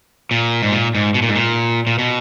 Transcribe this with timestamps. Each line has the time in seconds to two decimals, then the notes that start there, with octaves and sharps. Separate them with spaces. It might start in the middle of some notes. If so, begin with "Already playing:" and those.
0.31 A#2
0.63 G#2
0.72 A#2
0.95 G#2
1.14 B2
1.22 A#2
1.29 G#2
1.35 A#2
1.87 A#2
1.99 B2